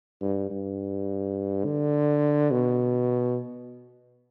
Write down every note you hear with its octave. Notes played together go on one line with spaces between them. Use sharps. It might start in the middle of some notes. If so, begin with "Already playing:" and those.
G2
G2
D3
B2